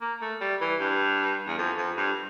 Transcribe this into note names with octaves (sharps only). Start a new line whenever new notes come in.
A#3
A3
G3
E3
G2
E2
F2
F2
G2